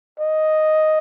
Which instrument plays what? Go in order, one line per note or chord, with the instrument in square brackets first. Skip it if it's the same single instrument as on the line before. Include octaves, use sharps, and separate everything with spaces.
[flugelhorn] D#5